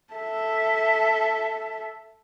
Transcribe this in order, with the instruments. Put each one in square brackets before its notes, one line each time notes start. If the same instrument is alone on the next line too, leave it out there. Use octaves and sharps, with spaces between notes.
[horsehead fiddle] A4 E5